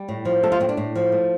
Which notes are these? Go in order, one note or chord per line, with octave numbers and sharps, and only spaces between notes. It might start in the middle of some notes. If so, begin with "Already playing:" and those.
Already playing: G3
A2
F3
A3 A4
F4
A2 C4
D4
A2
F3
A3